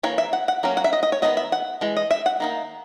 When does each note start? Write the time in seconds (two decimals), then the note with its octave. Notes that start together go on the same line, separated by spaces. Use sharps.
0.03 E3 A#3 C#5
0.18 E5
0.33 F#5
0.48 F#5
0.63 F#3 A#3 C#4
0.77 F#5
0.84 E5
0.93 D#5
1.03 D#5
1.12 C#5
1.22 D#3 G#3 B3 D#5
1.37 E5
1.52 F#5
1.81 E3 G#3
1.97 D#5
2.11 E5
2.26 F#5
2.40 D#3 A#3 D#4